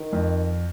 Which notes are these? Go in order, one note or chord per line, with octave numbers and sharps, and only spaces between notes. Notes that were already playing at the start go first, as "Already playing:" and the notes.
Already playing: D#3
F2